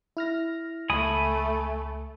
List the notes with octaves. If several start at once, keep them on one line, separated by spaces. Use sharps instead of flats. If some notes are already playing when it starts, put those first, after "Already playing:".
E4 F6 A#6
C#2 A3 G#5 B5 D#6